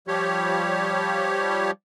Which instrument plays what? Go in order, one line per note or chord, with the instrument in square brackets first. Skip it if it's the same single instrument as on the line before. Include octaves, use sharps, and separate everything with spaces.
[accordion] F3 G3 G4 C#5